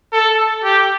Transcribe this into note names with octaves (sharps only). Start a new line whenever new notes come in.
A4
G4